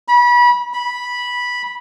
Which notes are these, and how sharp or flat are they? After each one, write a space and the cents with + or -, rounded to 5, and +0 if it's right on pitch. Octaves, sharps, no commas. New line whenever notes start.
B5 -30
B5 -10